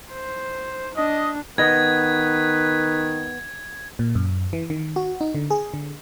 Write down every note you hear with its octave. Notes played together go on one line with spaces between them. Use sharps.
C5
D4 D#5
D#3 B3 B4 D#5 G#6
A#2
F#2
E3
D#3
F#4
D#4
D3
G#4
D3